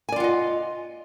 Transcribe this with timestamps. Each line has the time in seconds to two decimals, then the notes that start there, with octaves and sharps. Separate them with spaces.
0.09 G#5
0.12 D5
0.16 F4
0.20 F#5
0.24 D#5